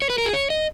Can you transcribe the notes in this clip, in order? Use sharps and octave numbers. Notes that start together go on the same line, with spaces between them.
C#5
B4
A#4
G#4
C#5
D#5